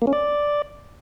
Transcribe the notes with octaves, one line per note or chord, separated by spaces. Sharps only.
A#3
C#4
D5